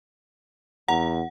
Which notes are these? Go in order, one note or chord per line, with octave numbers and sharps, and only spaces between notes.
E2 F#5 A#5